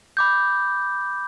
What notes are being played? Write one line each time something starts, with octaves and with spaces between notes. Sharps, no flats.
B5 D6 G6